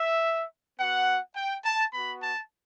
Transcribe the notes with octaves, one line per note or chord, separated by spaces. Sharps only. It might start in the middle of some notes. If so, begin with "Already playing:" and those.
Already playing: E5
B3 F#4 F#5
G5
A5
B3 F#4 B5
A5